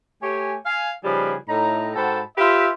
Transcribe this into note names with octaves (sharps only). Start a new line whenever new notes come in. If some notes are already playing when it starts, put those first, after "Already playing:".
A3 G4 C#5 G#5
F5 G#5
C#3 F3 G3 D#4 G#4 B4
A2 D#4 A#5
G#2 F#4 A4 G5 A5 B5
F4 G4 B4 E5